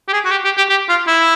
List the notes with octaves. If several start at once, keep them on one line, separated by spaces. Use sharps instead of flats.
G4
G#4
F#4
G4
G4
G4
G4
F4
E4